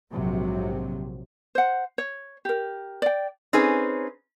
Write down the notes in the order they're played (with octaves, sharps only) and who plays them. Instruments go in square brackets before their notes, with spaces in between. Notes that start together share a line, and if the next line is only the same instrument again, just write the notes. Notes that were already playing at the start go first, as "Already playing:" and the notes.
[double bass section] A#1 G#2 C3 F#3
[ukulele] C5 F#5
C#5
G4 A#4
D5 G5
[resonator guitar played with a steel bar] C4 C#4 D#4 G#4 B4